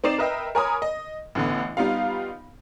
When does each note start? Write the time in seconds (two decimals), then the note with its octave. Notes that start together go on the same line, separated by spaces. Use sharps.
0.04 C4 D#4 D5 C7 E7
0.18 A#4 B4 D#5 E5 G5
0.55 A#4 C#5 G#5 A#5 B5 D#6
0.82 D#5
1.35 A1 D3 B3
1.77 G3 B3 D#4 F4 F5